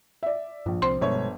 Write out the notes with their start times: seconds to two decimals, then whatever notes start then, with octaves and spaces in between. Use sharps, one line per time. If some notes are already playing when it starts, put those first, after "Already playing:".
0.23 D5 E5
0.66 A#1 G2
0.82 C2 C4 C5 C6
1.01 G1 B2 G#3 C#5